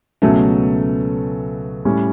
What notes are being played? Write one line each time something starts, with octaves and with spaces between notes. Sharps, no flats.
C#2 B2 F#3 A3 C#4
A2 G3 C#4